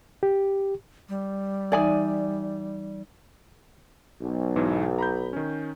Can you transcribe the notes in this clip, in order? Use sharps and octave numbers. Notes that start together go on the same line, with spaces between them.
G4
G3
E3 D#4 D5 G#5
B1
G#2 B2 E3
A#5 B5 G6
D#3 C#4